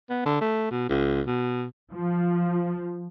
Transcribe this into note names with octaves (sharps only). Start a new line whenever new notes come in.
B3
D3
A3
B2
C#2
B2
F3